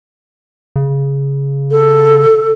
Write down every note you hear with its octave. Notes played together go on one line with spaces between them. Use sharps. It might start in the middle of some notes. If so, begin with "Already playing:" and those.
C#3
A4